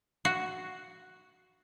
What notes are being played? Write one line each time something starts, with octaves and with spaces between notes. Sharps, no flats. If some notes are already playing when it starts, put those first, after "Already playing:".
F#4